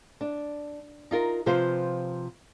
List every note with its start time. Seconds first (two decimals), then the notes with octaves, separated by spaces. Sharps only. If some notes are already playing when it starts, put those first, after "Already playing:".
0.21 D4
1.11 D#4 F4 A#4
1.46 C3 F3 F4 B4 C5